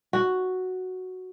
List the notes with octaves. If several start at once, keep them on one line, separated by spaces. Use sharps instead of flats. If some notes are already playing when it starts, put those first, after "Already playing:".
F#4